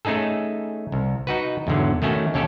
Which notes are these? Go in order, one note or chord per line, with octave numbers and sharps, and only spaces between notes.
A3 C#4 D#4 G#4 A4
C2
D#4 F#4 B4
E2 G#2 D3 F#3
D#3 A3 C#4 F#4
D#2 C#4 G4 A4